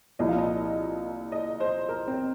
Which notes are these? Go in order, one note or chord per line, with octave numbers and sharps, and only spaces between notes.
C2 A#2 F3 D#5
F5
D#5
D#5
C5
A#4
C4